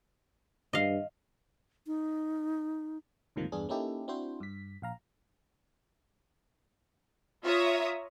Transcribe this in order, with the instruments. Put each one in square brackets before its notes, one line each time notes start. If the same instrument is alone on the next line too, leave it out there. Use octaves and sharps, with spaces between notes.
[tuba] G2 [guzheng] D#5 F5
[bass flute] D#4
[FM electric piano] D2 G#2 C3 D#3 F3 A#3
E2 G2 B3 D4 G#4
A#3 C#4 D#4 E4 G4 A4
C4 D4 E4 F#4 C5
G2 B6
A#1 F5 A#5
[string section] F4 C#5 E5 A#5 D#6